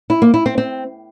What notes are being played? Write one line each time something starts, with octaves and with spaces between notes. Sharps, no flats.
E4
A#3
E4
C4
C4